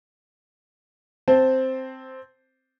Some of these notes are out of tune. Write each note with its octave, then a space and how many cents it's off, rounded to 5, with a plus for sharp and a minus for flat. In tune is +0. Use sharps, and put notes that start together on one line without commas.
C4 +0 C5 +0 A5 +0